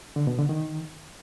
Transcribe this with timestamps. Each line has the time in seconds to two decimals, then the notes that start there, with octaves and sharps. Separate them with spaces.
0.16 D3
0.27 B2
0.38 D3
0.49 D#3